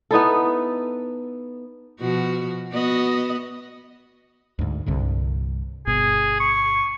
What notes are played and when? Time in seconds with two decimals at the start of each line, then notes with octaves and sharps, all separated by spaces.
0.11 B3 D#4 E4 A4
2.00 B2 F3 F#4
2.72 B3 F#4 D#5
4.59 D2 G#2
4.86 C2 G2 D3
5.87 G1 B2 G#4
6.40 C#6